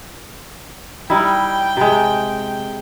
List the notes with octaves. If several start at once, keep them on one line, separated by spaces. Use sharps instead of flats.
G3 D#4 E4 G5
C3 G#3